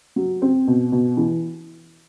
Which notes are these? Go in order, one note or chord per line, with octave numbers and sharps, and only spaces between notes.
F#3
C4
B2
B2
E3